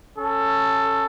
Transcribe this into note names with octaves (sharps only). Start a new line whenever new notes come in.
C#4 A4